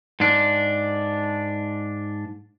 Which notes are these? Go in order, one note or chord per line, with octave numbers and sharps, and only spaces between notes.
G#2 D4